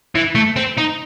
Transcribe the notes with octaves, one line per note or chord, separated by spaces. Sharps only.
E3
A3
C4
D#4